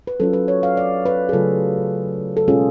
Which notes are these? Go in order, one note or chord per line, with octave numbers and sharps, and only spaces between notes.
B4
F#3 C#4 F4 A4
B4
C#5
F5
D5
B4
G#4
C#3 F#3 A3 F4 A4
A4
B2 G#3 C#4 F4 G#4